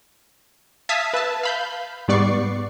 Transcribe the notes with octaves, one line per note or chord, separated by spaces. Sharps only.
E5 F5 A5 D#6 G#6 B6
B4 E5 A5
F5 B5 G6
G#2 G3 B3 D5 C#6 C7